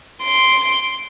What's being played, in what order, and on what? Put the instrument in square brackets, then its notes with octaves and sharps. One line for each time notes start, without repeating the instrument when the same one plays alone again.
[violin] C6 D7